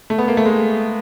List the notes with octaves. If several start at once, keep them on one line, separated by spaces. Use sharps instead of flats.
A3
B3
A#3
A3
G#3